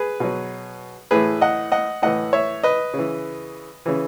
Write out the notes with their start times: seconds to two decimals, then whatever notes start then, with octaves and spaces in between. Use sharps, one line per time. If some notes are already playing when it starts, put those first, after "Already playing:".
Already playing: G#4 B4
0.20 B2 F#3
1.11 A2 E3 G#4 B4
1.41 D#5 F#5
1.72 D#5 F#5
2.02 A2 E3 D#5 F#5
2.33 C#5 E5
2.63 B4 D#5
2.94 C#3
2.99 E3
3.86 C#3 E3